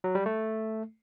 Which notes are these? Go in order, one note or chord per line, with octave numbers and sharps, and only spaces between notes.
F#3
G3
A3